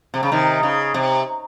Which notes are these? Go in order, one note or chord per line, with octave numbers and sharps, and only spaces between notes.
C3
C#3
C3 D#3
C#3
C3